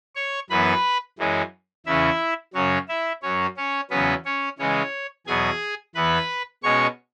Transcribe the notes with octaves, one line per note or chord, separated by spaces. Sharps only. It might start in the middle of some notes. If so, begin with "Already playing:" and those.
C#5 C#6
F#2 E3 B3 B4 B5
F#2 E3 G#3 C#4
E2 C#3 E3 C#4 E4 E5
F#2 C#3 F#3 C#4 C#5
E4 E5
F#2 F#3 C#4 C#5
C#4 C#5
E2 C#3 F#3 B3 C#4 B4
C#4 C#5
C#3 E3 G#3 C#4 C#5
E2 B2 F#3 B3 G#4 G#5
E2 E3 B3 B4 B5
B2 G#3 C#4 C#5 C#6